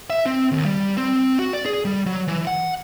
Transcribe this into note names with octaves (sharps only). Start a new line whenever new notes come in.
E5
C4
D#2
G3
C4
F#4
D5
G#4
G3
F#3
E3
F#5